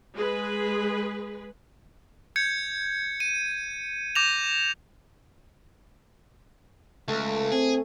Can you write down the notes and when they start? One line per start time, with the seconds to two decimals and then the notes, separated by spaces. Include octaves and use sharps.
0.14 G#3 G#4 B4
2.36 G6 G#6 C#7
3.20 D#7
4.15 D6 G6 A#6 E7 F7
7.08 C#2 A3
7.52 C4 G#4